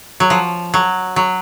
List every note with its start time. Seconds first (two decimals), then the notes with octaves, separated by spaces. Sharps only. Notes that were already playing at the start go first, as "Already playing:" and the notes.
0.20 F#3
0.30 F3
0.74 F#3
1.16 F#3